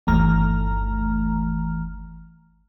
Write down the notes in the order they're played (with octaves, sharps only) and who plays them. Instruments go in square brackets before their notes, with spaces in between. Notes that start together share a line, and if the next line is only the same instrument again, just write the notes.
[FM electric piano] G1 D#2 E3 A3 A#5 F6